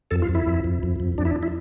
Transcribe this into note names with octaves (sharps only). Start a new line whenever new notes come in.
F2 A4
F4
F2
E4
F2
F2
F2
F2
F2 D4
E4
D4
E4